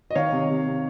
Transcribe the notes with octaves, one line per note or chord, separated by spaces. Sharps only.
D#5
D#3 C#5 F5
C3
C3
C3